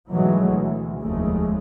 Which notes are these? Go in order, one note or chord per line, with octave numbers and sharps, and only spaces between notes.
G#2 B2 E3 F#3 G#3 A3
D2 E3
F1 D#2 C#3 G#3 A3